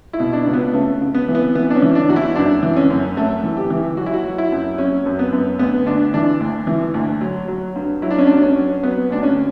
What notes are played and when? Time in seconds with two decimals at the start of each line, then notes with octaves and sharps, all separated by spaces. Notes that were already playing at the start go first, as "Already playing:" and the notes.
0.13 E4
0.20 B2
0.33 D4
0.47 C#2
0.53 B3
0.74 C#3 A3
1.01 C#3
1.14 B3
1.28 E3
1.35 B3
1.55 E3 B3
1.70 D4
1.75 C#4
1.82 E3
1.95 D4
2.09 E2 F#4
2.16 E4
2.36 F#2 D4
2.63 E3
2.76 C#4
2.90 F#2
3.17 F#2 A3
3.43 E3
3.57 G4
3.70 E3
3.97 F#3 F#4
4.06 E4
4.14 F#4
4.24 F#3
4.38 E4
4.52 F#2
4.78 F#3 C#4
5.06 F#2
5.19 B3
5.32 F#2
5.59 D2 B3
5.86 D2 D4
6.14 E3 D4
6.40 D2
6.67 E3
6.94 D2
7.21 F#3
7.48 F#3
7.76 G2
8.02 F#3 E4
8.11 D4
8.18 C#4
8.27 G2 D4
8.42 C#4
8.56 F#3
8.83 F#3 B3
9.10 D2 D4
9.23 C#4